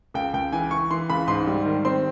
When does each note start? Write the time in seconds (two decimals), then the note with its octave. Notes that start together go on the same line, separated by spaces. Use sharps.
0.14 C#2 G5
0.33 C#2 G5
0.52 E3 G#5
0.71 E3 C#6
0.91 E3 C6
1.10 C#2 B5
1.27 G#2 C6
1.47 G3
1.65 D#3
1.85 C4 C6